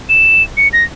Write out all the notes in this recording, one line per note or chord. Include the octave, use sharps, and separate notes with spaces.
E7
C#7
A#6